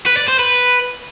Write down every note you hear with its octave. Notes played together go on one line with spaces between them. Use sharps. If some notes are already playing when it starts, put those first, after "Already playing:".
B4
D5
C5
B4